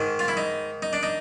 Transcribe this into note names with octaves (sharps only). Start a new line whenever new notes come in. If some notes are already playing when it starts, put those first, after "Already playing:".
Already playing: G#2 D#3
F4
E4
D#4
D#4
D4
D#4